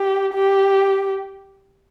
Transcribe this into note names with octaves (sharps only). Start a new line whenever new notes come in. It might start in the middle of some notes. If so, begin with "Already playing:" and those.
Already playing: G4
G4